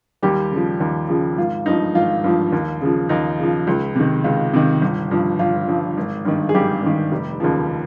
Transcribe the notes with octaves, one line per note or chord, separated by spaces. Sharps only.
D#2 G3 G4
C#3 F3
D#2
C#3 F3
G#1 F4
G2 F3 D#4
G#1 F4
G2 F3
D#2
C#3 F3
D#2 D#4
C#3 F3
C#2
C3 D#3
C#2 F4
C3 D#3
G1
G2 F3
G1 F4
G2 F3
G#1
G2 D#3
G#4
G#1 G3 G4
G2 D#3
F1
D#2 C#3 F3